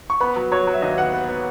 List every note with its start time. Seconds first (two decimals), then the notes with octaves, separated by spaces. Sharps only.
0.10 C#6
0.21 B3 B5
0.36 F#3
0.52 F#3 C#5
0.67 F#3
0.74 E5
0.82 D#2 D#5
0.98 B3 F#5
1.14 B3
1.29 B3